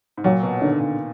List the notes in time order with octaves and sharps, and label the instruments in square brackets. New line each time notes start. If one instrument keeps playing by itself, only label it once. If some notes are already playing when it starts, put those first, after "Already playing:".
[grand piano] G#2
[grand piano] A#2 [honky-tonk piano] F#3
[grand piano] B2
[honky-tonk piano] D3 [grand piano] D#3
[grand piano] A#2